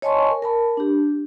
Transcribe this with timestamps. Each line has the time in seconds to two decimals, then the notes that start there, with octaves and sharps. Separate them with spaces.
0.02 C#5 D#5 G#5 A5 C6 C#6
0.31 A#4
0.42 A#4 A5 B5
0.77 D4 G4